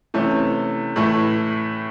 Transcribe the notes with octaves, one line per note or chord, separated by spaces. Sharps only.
C3 E3 A3 C#4
A2 E3 A3